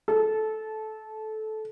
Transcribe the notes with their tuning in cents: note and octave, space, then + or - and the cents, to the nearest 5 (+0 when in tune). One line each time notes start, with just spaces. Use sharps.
A4 -15